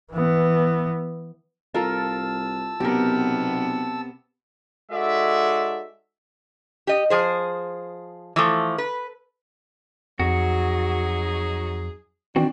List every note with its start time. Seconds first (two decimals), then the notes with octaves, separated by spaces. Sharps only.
0.12 E3 B3
1.74 C2 F4 A4 A#4 A5 E6
2.80 B1 C3 B3 G4 A#4
4.92 G#3 D#4 F#4 A4 D5 E5
6.87 G4 D#5
7.10 F3 G#4 C5
8.36 E3 F3 A3
8.78 B4
10.20 F2 F#3 D#4 F#4 G#4
12.36 D#3 E3 C4 D4 F#4